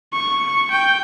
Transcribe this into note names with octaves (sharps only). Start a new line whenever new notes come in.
C#6
G5